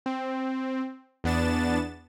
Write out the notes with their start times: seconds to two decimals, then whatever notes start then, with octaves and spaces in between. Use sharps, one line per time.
0.06 C4
1.24 E2 B3 D4 A6 E7